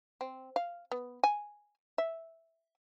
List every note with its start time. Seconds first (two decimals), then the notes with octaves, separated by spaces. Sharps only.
0.21 C4
0.56 F5
0.92 B3
1.24 G#5
1.98 E5